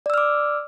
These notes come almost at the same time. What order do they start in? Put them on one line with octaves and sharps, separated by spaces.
D5 E6 F6 D6